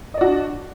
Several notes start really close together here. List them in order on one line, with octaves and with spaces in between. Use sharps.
D#5 D5 F#4 D4